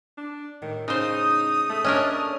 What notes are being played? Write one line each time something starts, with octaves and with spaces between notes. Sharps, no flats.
D4
A2 D#3 G3
C#3 D#4 C5 D#6
A3 A4
D#2 C#4 D4 A#4 C#5 D#5